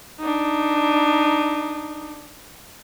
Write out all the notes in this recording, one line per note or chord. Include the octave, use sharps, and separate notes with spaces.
D4 D#4